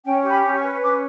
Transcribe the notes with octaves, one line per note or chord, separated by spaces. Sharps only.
C#4 G5
G4
B5
C#4
C#6
B4
C#4 D6